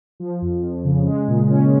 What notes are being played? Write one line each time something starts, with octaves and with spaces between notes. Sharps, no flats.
F3
F2
F2
C#3
G#3
A#2
C#4